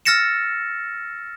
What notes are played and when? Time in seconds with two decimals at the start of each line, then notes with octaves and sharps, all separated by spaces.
0.05 E6 F6 A6 A#6 C#7 E7